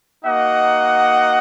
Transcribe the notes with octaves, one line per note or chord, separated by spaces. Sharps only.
A#3 D#4 F#4 D#5 F#5